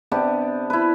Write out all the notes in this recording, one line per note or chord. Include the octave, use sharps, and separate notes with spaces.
C3 B3 D4 G4
E4 B4